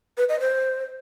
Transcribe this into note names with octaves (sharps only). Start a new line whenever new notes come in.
B4
D#5
C5